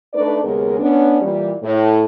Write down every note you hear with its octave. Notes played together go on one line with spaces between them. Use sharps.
A3 D4 D#4 B4 D5
D#2 C#3 G#3 B3 G#4 A#4
B3 C#4 D4
A#2 E3 G3
A2